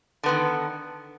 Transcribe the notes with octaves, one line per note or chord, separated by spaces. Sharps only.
D3 D#3 B3